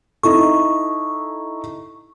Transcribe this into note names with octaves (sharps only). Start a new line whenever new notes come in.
D#4 E4 A4 C#6